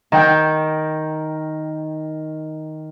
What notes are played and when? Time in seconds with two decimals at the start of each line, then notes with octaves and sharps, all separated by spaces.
0.12 D#3 G5 G6